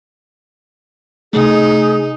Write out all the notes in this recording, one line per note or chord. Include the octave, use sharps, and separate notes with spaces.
C3 A3 D#4 G#4